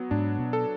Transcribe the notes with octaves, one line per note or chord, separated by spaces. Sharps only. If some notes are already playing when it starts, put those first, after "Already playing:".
Already playing: F#3 B3
G#2 D4
B2
A4